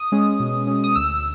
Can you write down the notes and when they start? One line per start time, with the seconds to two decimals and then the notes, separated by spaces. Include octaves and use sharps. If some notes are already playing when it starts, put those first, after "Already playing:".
Already playing: D#6
0.12 G#3 C#4
0.40 B2
0.67 G#3 C#4
0.84 D#6
0.96 D2 E6